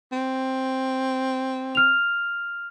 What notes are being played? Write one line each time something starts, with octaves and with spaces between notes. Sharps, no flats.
C4
F6 F7